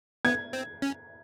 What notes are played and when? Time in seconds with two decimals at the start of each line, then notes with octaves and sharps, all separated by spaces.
0.25 B3 G#6
0.53 C4
0.82 C#4